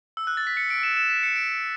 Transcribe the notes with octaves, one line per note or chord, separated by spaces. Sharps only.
E6
F#6
A6
B6
C#7
D7
E7
E7
B6
C#7
D7